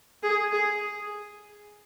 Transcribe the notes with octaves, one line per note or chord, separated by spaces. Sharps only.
G#4
G#4